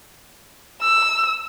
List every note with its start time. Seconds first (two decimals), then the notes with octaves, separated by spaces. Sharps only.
0.81 E6